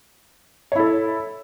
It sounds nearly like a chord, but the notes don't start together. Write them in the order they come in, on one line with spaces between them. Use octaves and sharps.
C#5 E4 A4